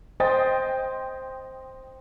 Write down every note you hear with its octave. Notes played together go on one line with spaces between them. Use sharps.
C5 D#5 G5 A6